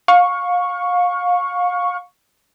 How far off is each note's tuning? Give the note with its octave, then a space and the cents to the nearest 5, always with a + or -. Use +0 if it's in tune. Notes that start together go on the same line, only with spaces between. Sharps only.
F5 +30 C#6 +0